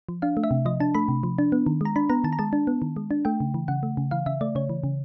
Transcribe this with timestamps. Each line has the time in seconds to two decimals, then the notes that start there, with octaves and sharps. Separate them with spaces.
0.09 F3
0.22 D4 F5
0.37 A3
0.44 E5
0.51 C3
0.66 F3 D#5
0.80 D4 A5
0.95 A3 B5
1.08 C3
1.23 F3
1.38 D4
1.52 B3
1.66 D#3
1.81 G#3 A#5
1.96 D4 B5
2.10 B3 A#5
2.24 D#3 A5
2.33 A#5
2.39 G#3 A5
2.53 D4
2.67 B3
2.82 D#3
2.97 G#3
3.11 D4
3.25 A3 G5
3.40 C#3
3.54 E3
3.68 C#3 F#5
3.83 A3
3.97 C#3
4.11 E3 F5
4.26 C#3 E5
4.41 A3 D5
4.55 C#3 C#5
4.69 E3
4.84 C#3